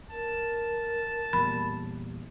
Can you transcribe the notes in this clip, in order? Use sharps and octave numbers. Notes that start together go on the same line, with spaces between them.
A#4 A5
E2 A#2 G3 B5